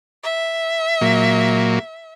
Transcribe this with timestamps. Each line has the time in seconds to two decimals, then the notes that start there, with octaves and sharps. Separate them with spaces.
0.24 E5
1.01 A#2 F#3 A#3